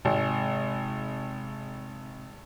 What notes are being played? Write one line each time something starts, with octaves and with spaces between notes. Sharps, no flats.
G#1 C3 G#3